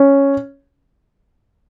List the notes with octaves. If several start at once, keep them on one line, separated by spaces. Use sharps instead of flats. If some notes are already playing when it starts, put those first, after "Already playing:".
Already playing: C#4